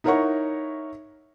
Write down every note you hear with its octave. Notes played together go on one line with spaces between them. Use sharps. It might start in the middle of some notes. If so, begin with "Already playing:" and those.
D#4 E4 A#4 C#5 F#5 C#6